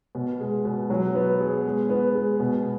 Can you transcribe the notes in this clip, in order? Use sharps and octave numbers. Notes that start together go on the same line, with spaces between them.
B2
G#3
B2
F#3
B3
G#4
G#3
B3
G#3
B2